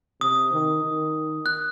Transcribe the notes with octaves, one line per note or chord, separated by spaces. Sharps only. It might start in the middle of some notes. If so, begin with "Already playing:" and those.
C3 D#6
D#3
D#3
F#6